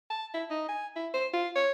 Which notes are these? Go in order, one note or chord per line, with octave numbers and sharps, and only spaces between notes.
A5
E4
D#4
G#5
E4
C5
F4
C#5